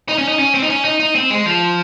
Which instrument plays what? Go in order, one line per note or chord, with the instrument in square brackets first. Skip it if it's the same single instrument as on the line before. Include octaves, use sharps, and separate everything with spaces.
[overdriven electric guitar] D#4
C#4
D#4
C#4
C4
D#4
C#4
D#4
D#4
C4
G#3
F3